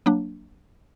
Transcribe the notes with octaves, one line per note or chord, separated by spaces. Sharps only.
F#3 A#3 D4